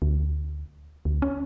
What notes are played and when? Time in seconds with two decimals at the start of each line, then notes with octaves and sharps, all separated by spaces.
0.02 D2
1.05 D2
1.22 C#4